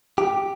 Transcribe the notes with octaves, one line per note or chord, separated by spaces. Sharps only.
G4